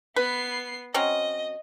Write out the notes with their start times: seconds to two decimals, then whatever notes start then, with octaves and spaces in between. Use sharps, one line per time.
0.16 B3 B4 C7
0.94 F#3 C4 C#4 D#5